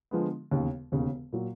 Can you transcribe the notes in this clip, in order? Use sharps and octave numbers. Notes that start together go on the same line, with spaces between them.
D3 F3 G#3 B3
E1 D#2 C#3
E1 D#2 C#3
A#2 F#3